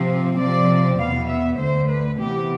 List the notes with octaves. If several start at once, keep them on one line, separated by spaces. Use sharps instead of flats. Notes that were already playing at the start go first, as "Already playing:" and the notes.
Already playing: C3 F3 C4
C3 F3 C4 D5
E2 B2 B3 F5
E5
D2 D3 A3 C5
B4
C3 E3 B3 G4